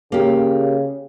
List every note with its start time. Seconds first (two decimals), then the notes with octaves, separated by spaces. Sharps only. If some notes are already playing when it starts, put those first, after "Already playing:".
0.12 C#3 A#3 G4